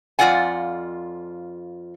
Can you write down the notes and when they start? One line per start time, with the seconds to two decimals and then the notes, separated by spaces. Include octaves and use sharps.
0.19 F2 C3 F4 D5 F#5 G#5